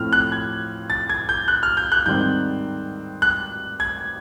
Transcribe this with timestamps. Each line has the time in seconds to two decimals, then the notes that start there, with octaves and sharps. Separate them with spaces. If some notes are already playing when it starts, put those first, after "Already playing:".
Already playing: A2 F3 A3 C4 F6
0.13 F#6
0.32 G#6
0.90 A6
1.09 G#6
1.29 G6
1.48 F#6
1.63 F6
1.77 G6
1.92 F#6
2.06 G#2 D#3 G3 C4 G6
3.22 F#6
3.80 G#6